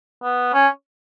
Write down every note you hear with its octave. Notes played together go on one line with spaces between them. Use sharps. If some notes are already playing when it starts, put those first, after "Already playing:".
B3
C#4